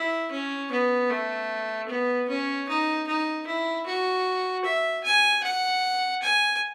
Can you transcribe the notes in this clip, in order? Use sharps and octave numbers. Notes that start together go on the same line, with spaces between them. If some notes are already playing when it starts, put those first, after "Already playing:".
Already playing: E4
C#4
B3
A3
B3
C#4
D#4
D#4
E4
F#4
E5
G#5
F#5
G#5